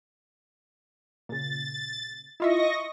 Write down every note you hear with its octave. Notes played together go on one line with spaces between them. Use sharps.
A#2 C#3 A6
E4 F4 D#5 E5 C#6 A#6